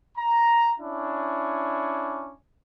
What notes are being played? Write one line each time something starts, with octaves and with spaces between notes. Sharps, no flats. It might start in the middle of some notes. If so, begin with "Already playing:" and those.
A#5
C#4 D4 E4